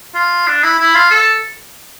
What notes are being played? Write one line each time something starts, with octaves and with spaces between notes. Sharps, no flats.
F4
D4
E4
E4
F4
A4